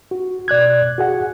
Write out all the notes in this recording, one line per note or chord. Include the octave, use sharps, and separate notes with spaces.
F#4
B2 D5 F#6 G#6
F#4 G#4 F#5